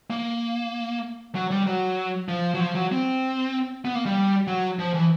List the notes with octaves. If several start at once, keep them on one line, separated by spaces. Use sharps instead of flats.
A#3
F#3
G3
F#3
F3
F#3
F3
F#3
C4
B3
A#3
G3
F#3
F3
E3